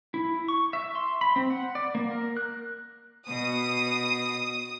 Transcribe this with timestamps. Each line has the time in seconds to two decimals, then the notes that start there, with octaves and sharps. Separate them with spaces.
0.14 E4
0.48 C#6
0.73 E5
0.95 C6
1.21 B5
1.36 C4
1.50 F#5
1.75 D5
1.95 A#3
2.11 A#4
2.37 F#6
3.28 B2 D#6